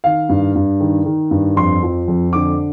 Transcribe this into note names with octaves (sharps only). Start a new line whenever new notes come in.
D#3 F5
G2
G2
D#3
D#3
G2
F2 C6
F3
F2
D3 D6